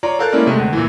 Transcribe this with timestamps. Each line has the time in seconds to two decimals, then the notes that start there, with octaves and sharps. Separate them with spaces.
0.03 F4 C#5 D5 A#5
0.19 A4 A#4 F5 F#6 G6 A6
0.32 G#3 A#3 C#4 E4 A#4 D5
0.46 C3 G#3 A3
0.59 D2
0.73 A#2 E3